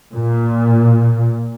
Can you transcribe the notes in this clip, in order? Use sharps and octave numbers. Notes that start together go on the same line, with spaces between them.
A#2